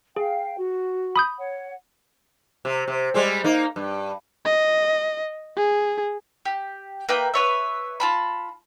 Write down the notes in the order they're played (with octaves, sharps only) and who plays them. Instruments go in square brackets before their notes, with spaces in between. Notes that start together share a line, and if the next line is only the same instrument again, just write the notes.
[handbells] G#4 [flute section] F5 G5
[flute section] F#4
[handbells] B5 D#6 G6
[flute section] C#5 F#5
[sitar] C3
C3
G3 G#3 C4
A#3 D#4
G2
[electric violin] D#5
G#4
[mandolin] G4
A#3 B4 E5 G5
B4 C#5 E5
F4 A5 B5